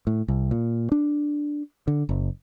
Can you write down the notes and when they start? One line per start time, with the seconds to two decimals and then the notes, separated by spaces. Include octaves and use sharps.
0.07 A2
0.28 C2
0.51 A#2
0.92 D4
1.88 D3
2.09 F#1